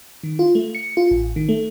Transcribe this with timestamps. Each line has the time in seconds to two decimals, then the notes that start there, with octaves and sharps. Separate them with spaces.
0.24 D#3
0.39 F4
0.55 A3
0.75 C#7
0.97 F4
1.11 A1
1.36 D#3
1.49 A3